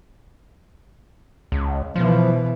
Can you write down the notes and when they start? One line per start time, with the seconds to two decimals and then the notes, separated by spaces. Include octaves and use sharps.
1.52 C#2
1.96 B2 E3 F3